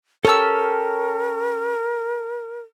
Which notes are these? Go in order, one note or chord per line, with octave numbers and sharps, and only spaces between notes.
C#4 G4 A4 A#4 A5 E6